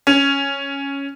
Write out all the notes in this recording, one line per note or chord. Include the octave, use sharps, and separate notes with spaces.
C#4